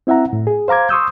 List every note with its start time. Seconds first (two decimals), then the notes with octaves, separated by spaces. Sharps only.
0.07 C4 E4 E5 F#5 A#5
0.33 A2
0.47 G#4
0.68 C5 F5 A#5 D6 G#6
0.89 C6 C#6 D#6 E6 G6